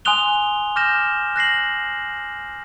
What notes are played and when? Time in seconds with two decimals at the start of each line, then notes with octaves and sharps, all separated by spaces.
0.05 G#5 C6 D#6 F#6 F7 G7
0.76 D6 F6 G6 A#6 E7
1.36 F#6 A#6 C7 F#7